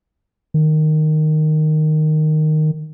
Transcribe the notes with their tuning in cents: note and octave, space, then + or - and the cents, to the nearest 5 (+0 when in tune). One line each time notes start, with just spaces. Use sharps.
D#3 -10